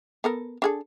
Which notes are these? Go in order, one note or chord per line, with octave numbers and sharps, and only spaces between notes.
B3 A4 A#4
D4 G#4 A4